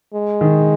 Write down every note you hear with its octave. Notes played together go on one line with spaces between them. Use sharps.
G#3
D#3